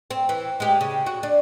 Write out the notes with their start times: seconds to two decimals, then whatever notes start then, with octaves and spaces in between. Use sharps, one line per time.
0.11 C4
0.29 E3
0.60 G#3 G4
0.81 C#3
1.06 F#4
1.23 D4